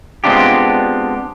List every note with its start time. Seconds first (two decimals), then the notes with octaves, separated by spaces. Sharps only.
0.24 G#3 B3 C4 D4 F4 G4